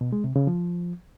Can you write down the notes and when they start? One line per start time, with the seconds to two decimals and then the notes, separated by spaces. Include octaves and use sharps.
0.01 B2
0.13 G#3
0.24 C3
0.36 C#3
0.47 F3